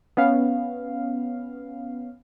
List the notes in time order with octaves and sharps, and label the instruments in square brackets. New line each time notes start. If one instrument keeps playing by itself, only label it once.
[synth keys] B3 C#4 F5